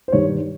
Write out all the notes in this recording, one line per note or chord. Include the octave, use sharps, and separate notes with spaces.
C5
G2 D#3 G3 C#5